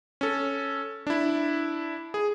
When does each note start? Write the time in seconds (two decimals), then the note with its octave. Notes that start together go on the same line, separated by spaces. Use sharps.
0.21 C#4 A4
1.07 D4 E4
2.14 G#4